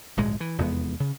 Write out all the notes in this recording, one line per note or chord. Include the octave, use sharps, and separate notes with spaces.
D1 A#1 G#2 G#3
E3
F1 E2 G#3 B3
C#3